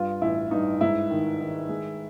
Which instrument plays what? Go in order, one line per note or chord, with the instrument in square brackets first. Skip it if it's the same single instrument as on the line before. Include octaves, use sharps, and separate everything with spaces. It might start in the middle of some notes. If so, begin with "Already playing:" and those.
Already playing: [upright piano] G2 F4
A1 E4
G2 D#4
G#2 E4
D#3
D#3
G#3